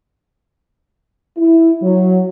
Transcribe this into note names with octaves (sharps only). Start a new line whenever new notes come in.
E4
F#3